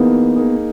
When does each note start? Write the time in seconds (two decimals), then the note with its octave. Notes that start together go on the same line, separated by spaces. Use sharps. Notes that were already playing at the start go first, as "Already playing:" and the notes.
Already playing: E3 A#3 B3 D#4 G#4
0.36 A#3 D#4 G#4